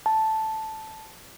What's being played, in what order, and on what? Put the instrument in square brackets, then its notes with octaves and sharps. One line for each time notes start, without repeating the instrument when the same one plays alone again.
[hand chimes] A5